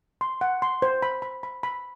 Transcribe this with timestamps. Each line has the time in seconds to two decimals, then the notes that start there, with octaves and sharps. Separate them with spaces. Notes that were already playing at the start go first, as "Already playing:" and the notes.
0.21 C6
0.41 F#5
0.62 C6
0.82 C5
1.02 B5
1.22 B5
1.43 B5
1.63 B5